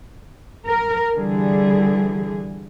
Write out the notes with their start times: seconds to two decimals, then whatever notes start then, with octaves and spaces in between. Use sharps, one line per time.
0.67 A#4
1.18 D3 E3 G3 G#4